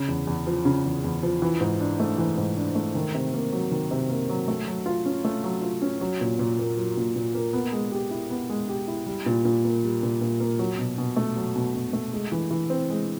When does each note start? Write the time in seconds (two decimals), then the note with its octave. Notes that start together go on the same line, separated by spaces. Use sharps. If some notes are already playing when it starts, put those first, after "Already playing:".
Already playing: C#3
0.08 E2
0.27 E2
0.47 F3
0.65 C#3
0.85 E2
1.04 E2
1.23 F3
1.42 E3
1.61 G#2
1.80 D4
2.00 A3
2.18 E3
2.37 G#2
2.57 D4
2.75 A3
2.95 D#3
3.14 C3
3.33 A#3
3.53 F#3
3.71 D#3
3.91 C3
4.10 A#3
4.29 F#3
4.48 A3
4.67 F#3
4.86 F4
5.05 C#4
5.25 A3
5.44 F#3
5.62 F4
5.82 C#4
6.01 F#3
6.21 A#2
6.39 A#2
6.59 A#3
6.77 F#3
6.97 A#2
7.16 A#2
7.35 A#3
7.53 B3
7.72 G#3
7.92 G4
8.11 E4
8.30 B3
8.50 G#3
8.69 G4
8.87 E4
9.06 G3
9.26 A#2
9.45 A#2
9.64 A#3
9.83 G3
10.03 A#2
10.21 A#2
10.40 A#3
10.59 F#3
10.79 B2
10.98 B2
11.17 A3
11.36 F#3
11.56 B2
11.74 B2
11.93 A3
12.13 G#3
12.32 E3
12.51 E3
12.70 C4
12.90 G#3